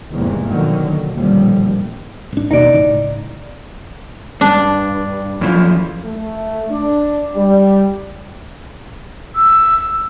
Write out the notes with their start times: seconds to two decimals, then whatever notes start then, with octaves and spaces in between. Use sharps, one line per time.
0.11 G#1 E2 G2 C3 E3 A#3
0.48 B2 D3 D#3 F3 F#3 A#3
1.11 A1 D#2 A#2 D3 F3 G3
2.33 G#1 D4
2.51 D#2 B2 D#4 D5
2.73 C#2 A2
4.41 G2 D4
5.41 F#2 E3 F3
6.04 A3
6.71 D4
7.36 G3
9.36 E6